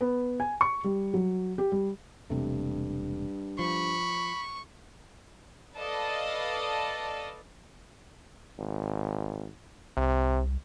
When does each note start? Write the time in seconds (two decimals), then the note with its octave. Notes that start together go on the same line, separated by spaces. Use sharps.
0.01 B3
0.40 G#5
0.61 C#6
0.84 G3
1.14 F#3
1.58 G4
1.72 G3
2.30 E1 G2 C3 A3
3.59 F3 B5 C#6
5.77 A4 B4 D5 D#5 F5 A5
8.59 G#1
9.97 C2 C3